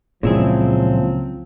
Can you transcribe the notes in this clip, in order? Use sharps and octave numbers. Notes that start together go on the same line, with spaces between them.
C#2 A#2 C#3 F3 F#3 C4 E4 G#4